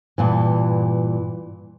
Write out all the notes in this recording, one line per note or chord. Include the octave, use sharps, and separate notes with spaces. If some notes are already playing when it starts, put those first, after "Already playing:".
G2 A#2 E3